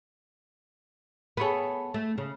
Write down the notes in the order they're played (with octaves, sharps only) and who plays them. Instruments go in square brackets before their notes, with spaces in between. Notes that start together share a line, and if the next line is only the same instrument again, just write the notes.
[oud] B3 G#4 [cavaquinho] A4 C#5 B5
[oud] A3
C#3